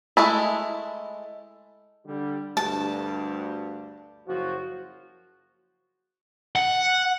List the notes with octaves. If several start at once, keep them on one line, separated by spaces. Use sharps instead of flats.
G#3 A3 E4
D3 G3
D2 G2 A5
F#1 F3 F#4
F#5